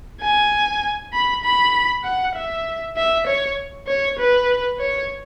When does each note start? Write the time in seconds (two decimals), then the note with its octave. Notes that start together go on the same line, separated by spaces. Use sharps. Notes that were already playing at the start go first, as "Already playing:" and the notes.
0.21 G#5
1.13 B5
1.43 B5
2.04 F#5
2.35 E5
2.97 E5
3.27 C#5
3.87 C#5
4.19 B4
4.80 C#5